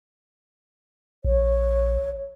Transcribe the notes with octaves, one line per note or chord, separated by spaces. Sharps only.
A#1 C#5